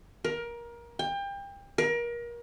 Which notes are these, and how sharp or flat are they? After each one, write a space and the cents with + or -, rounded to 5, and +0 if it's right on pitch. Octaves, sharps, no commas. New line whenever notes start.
A#4 +20
G5 +30
A#4 +30